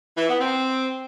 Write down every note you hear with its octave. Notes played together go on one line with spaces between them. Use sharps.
E3
B3
C4